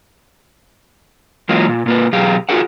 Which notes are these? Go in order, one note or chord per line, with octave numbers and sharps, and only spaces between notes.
E3 F#3 G#3 A#3 F4
A#2
A#2 A#3 B4
B2 F#3 G4 G#4 F5
F4 F#4 G#4 A#4 F#5